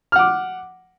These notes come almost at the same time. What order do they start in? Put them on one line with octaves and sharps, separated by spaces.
F6 F#5 D6